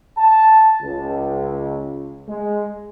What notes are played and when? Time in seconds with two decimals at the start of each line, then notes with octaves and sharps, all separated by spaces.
0.18 A5
0.81 C#2
2.29 G#3